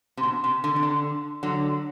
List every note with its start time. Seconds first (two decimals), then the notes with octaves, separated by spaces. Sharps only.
0.17 C3
0.23 B2
0.44 C3
0.64 D3
0.76 C3
0.83 D3
1.43 D3 F#3